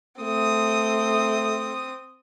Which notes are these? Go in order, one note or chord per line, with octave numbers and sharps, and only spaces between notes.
A3 C4 D#6